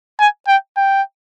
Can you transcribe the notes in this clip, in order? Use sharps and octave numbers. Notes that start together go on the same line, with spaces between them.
G#5
G5
G5